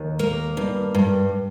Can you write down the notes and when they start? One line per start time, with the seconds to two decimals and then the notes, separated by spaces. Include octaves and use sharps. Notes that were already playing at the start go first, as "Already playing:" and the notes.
Already playing: D#2
0.19 A#3
0.57 G2
0.95 G2